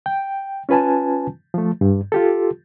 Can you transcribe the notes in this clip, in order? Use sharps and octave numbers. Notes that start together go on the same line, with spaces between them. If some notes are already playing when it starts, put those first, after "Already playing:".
G5
C#4 F4 B4 G#5 A5
F3 A3
G2
F4 G4 A4